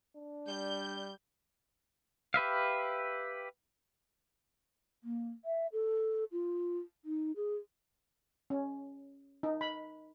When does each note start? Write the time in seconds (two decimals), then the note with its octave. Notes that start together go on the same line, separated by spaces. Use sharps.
0.16 D4
0.48 G3 G6
2.34 G4 B4 E5 F5
5.04 A#3
5.45 E5
5.73 A4
6.32 F4
7.05 D#4
7.36 G#4
8.50 C#4
9.43 D#4
9.61 B5